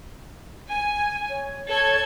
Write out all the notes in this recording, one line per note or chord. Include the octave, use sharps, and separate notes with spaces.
G#5
C#5
A4 C#5 G#6